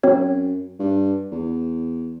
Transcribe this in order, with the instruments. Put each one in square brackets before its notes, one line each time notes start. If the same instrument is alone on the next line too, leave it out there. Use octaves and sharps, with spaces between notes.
[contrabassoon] F#2 [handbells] C4 F#4 C#5
[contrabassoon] G2
E2